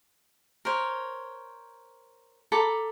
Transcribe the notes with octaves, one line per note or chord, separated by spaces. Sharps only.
A#4 C5 C#5
A4 A#5 B5 D6